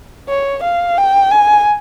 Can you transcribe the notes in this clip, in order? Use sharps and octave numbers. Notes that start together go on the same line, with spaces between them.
C#5
F5
G5
G#5